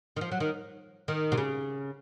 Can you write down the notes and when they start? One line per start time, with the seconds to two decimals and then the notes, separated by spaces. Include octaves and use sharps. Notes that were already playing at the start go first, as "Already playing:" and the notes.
0.16 D#3
0.21 F3
0.32 F#3
0.40 D#3
1.08 D#3
1.32 C3
1.38 C#3